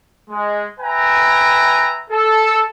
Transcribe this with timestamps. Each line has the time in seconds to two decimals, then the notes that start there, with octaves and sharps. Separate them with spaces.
0.29 G#3
0.80 B4 E5 G5 G#5 A#5
2.11 A4